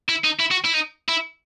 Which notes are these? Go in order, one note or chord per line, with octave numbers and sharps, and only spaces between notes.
E4
D#4
E4
F#4
E4
D#4
E4